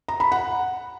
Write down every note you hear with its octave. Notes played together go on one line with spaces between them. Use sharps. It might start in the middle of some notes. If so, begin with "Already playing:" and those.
A#5
B5
F#5